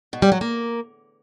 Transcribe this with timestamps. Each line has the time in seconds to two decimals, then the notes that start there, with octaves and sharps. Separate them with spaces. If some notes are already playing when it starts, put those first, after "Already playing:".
0.13 B2
0.22 G3
0.32 F#3
0.41 A#3